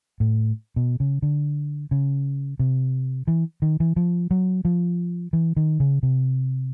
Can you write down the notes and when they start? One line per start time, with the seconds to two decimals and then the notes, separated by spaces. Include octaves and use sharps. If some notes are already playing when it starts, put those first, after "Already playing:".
0.20 A2
0.76 B2
1.00 C#3
1.22 D3
1.91 C#3
2.59 C3
3.27 E3
3.62 D#3
3.80 E3
3.96 F3
4.31 F#3
4.65 F3
5.33 E3
5.57 D#3
5.80 C#3
6.03 C3